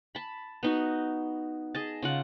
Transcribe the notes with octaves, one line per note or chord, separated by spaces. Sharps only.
A5 B5
B3 D#4 F#4
G#4 D#5 A5
C#3 F4 F#5